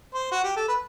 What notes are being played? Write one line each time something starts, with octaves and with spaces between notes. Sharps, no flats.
C5
F#4
G4
A4
B4